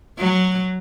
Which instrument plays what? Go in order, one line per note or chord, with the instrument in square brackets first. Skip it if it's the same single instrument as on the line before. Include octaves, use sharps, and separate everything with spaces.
[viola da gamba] F#3